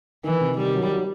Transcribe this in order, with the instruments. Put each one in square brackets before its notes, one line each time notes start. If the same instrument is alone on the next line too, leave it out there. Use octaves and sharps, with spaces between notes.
[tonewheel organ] D#3 [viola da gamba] E3
[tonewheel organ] C3
[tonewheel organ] D#3 [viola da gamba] G3
[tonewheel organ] F#3
F#3